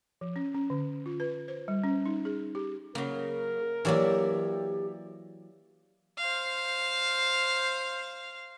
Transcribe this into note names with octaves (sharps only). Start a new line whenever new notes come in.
F3
C#4
C#4
D3
F4
B4
C5
G3
C#4
D#4
G#4
G4
C#3 F#3 A#3 A#4
E3 F#3 A#3 G4 C#5 D5 E5
C5 F5